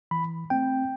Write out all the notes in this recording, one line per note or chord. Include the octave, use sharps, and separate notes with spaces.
E3 B5
A3 C4 G5